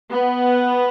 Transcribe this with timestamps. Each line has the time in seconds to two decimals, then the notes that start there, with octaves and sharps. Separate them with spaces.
0.11 B3